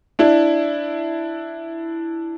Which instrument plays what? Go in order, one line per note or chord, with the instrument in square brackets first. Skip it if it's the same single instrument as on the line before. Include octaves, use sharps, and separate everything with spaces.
[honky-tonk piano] D4 E4